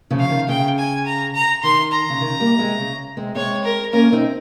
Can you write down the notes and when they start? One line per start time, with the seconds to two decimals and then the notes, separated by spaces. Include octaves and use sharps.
0.11 C#3 F3
0.19 F5
0.30 D#3
0.48 C#3 G5
0.78 G#5
1.06 A#5
1.35 A#5
1.63 D#3 C6
1.92 A#5
2.10 C#3
2.21 D#3
2.40 G3 A#3
2.59 G#3 C4
2.78 C#3
3.17 G#3 C4
3.35 G#3 C4 C#5
3.64 A#4
3.92 A#3 C#4 A#4
4.12 C4 D#4